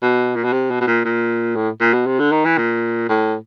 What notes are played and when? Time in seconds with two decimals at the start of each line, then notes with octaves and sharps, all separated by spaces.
0.03 B2
0.36 A#2
0.44 B2
0.53 C3
0.71 B2
0.81 B2
0.87 A#2
1.05 A#2
1.56 A2
1.80 A#2
1.94 B2
2.07 C3
2.20 D3
2.32 D#3
2.45 E3
2.58 A#2
3.09 A2